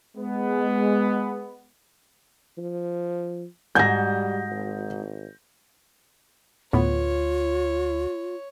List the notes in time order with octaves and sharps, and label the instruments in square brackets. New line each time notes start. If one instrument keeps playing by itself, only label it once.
[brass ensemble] G#3 B3
[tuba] F3
[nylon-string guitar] G#2 F#4 G#5 [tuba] G3 [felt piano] G6 A#6
[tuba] G#1
[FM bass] D2 [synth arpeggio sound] A2 B3 [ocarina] F4 [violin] C#5